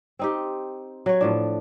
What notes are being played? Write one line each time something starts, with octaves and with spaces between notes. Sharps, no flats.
C4 D#4 G4
F#3 C#5
A2 F3 D4